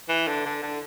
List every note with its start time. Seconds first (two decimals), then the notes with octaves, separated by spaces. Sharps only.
0.09 E3
0.28 D3
0.46 D3
0.63 D3